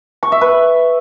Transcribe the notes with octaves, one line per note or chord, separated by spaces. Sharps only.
C#6
E5
B4